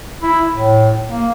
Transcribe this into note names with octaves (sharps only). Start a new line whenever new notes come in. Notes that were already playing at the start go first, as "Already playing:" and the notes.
E4
A2
A#3